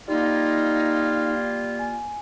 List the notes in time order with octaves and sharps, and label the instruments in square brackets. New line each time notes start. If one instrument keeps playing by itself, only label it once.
[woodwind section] G3 A#3 F4 [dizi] D#4
[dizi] G#5